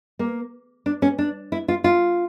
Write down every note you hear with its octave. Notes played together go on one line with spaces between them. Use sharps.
A#3
D4
C#4
D4
E4
F4
F4